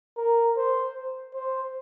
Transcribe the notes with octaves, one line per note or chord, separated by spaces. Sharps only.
A#4
C5
C5